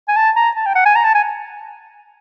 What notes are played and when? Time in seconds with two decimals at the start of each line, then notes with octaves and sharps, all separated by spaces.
0.08 G#5
0.16 A5
0.36 A#5
0.56 A5
0.66 G5
0.75 F#5
0.86 G#5
0.96 A#5
1.04 A5
1.15 G#5